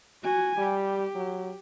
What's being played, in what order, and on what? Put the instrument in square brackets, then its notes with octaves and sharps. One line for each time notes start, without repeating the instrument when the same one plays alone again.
[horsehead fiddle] F#4 G#5
[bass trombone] G3 [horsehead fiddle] G4
[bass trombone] F#3